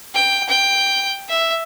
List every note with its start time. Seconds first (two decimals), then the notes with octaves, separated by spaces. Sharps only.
0.15 G5
0.49 G5
1.29 E5